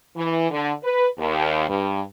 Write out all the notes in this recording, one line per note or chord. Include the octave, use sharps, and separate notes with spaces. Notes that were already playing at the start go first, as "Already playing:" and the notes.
E3
D3
B4
D#2
G2